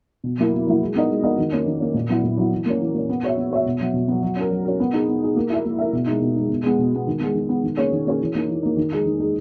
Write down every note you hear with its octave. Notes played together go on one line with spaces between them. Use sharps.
B2
F#3 A#3 E4
B2
F#3 A#3 E4
G#3
B3 D#4 A#4 D#5
G#3
B3 D#4 A#4 D#5
D#3
A#3 C#4
D#3
A#3 C#4
A#2
F#3 B3 E4
A#2
F#3 B3 E4
E3
A#3 C#4
E3
A#3 C#4
B3
F#4 C#5 E5
B3
F#4 C#5 E5
B2
F#3 B3
B2
F#3 B3
F#3
C#4 F#4 A#4
F#3
C#4 F#4 A#4
B3
D#4 G#4
B3
D#4 G#4
A#3
E4 A#4 E5
A#3
E4 A#4 E5
B2
G#3 D#4
B2
G#3 D#4
B2
G#3 B3
B2
G#3 B3
D#3
G#3 B3
D#3
G#3 B3
D#3
A#3 C#4 G#4 C#5
D#3
A#3 C#4 G#4 C#5
E3
A#3 D#4
E3
A#3 D#4
D#3
G#3 D#4 G#4
D#3
G#3 D#4 G#4